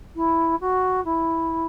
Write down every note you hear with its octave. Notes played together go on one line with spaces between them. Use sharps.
E4
F#4
E4